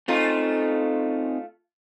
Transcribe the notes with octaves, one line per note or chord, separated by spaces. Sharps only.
A3 C4 C#4 D#4 F4